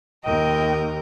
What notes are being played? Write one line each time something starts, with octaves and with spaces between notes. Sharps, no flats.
D#2 A#4 D#5 G5